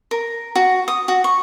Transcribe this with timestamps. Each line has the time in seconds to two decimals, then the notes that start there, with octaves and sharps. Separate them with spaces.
0.11 A#4
0.55 F#4
0.88 D#6
1.08 F#4
1.24 C#6